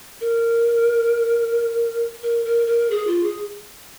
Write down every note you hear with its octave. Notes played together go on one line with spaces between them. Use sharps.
A#4
A#4
A#4
A#4
G#4
F4
G#4